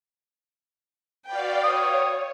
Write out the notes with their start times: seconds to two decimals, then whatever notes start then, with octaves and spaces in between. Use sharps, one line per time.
1.27 F#4 B4 D5 F5 G5
1.64 C#5 D#6